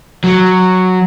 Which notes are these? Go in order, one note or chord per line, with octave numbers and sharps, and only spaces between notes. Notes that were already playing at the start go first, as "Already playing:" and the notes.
F#3